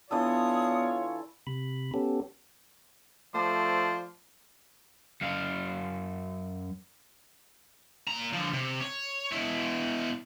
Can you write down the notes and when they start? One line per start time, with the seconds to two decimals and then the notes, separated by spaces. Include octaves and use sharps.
0.11 E3 B3 D4 F4 A4 C#5 D5 D#6
1.47 C3 B5
1.94 B3 C#4 G4 A4
3.33 F3 A3 C5 D5
5.21 F#2 F5
8.08 A#2 A#5
8.34 D3 F3
8.54 C3
8.81 C#5
9.32 B2 E4